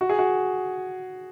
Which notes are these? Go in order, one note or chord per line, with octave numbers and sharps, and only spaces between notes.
F#4
G#4
F#4